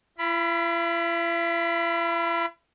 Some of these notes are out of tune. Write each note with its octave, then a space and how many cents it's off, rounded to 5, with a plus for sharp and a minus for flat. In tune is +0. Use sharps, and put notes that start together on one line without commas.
E4 +45 B5 +0